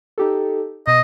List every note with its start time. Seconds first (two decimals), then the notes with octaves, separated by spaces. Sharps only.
0.18 D#4 G4 A4
0.87 B2 D#5